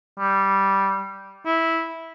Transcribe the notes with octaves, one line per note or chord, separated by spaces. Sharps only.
G3
E4